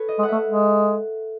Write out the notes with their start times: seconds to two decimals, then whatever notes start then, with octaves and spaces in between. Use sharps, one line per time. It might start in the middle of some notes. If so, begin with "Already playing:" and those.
Already playing: A4 B4 C#5
0.08 D#5
0.19 G#3
0.23 F#5
0.28 A3 E5
0.47 G#3